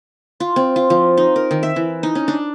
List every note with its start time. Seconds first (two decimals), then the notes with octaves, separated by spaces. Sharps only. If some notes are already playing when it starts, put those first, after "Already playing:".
0.40 F4
0.56 C4
0.76 F4
0.90 F3
1.17 D#4
1.36 A#4
1.51 D#3
1.63 E5
1.76 E3
2.03 D#4
2.15 C#4
2.28 D4